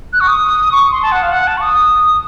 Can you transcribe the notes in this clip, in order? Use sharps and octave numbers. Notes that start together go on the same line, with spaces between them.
F#6
C#6
D#6
C#6
C6
A5
F#5
F5
F#5
A5
C#6
D#6